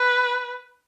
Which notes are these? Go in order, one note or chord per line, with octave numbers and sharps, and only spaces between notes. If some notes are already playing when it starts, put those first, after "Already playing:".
Already playing: B4